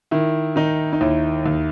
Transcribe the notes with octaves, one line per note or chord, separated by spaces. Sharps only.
D#3 E4
D#3 D#4
D#4
D#2 E4
D#2